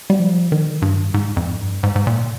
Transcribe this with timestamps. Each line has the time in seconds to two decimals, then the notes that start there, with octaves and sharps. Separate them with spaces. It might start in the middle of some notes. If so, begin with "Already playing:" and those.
0.10 G3
0.19 F3
0.52 D#3
0.82 G2
1.14 G#2
1.37 F2
1.60 G2
1.83 G#2
1.96 G#2
2.07 A#2